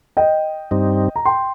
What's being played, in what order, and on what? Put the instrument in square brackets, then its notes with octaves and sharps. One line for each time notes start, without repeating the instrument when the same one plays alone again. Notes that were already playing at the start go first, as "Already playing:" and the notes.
[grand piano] D#5 G5
[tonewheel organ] G2 G3 C4 D#4
[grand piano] A#5
G5 C6